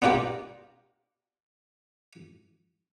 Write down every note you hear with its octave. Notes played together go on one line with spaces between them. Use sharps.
B3 D4 F4 G4 A#4